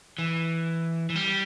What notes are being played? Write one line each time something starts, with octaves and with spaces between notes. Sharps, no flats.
E3
E3
G3